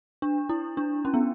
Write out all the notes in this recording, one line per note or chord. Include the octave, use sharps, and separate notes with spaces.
D4
E4
D4
C#4
B3